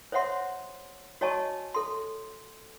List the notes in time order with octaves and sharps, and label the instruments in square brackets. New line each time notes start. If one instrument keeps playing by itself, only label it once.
[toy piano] C5 C#5 E5 F#5 C6
F#4 C#5 D#5 G#5 A5 C#6
A4 C6